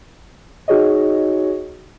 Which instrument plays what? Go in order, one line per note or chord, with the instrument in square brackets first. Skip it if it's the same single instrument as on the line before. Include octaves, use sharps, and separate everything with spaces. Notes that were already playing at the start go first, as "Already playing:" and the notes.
[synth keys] D#4 F#4 G#4 C#5 D#5